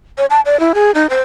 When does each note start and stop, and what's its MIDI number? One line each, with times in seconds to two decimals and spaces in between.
0.18 0.26 73
0.30 0.40 81
0.46 0.59 74
0.60 0.73 64
0.75 0.91 68
0.95 1.07 63
1.10 1.21 72